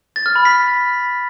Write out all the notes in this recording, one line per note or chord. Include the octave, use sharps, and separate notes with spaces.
A6
F6
B5
B6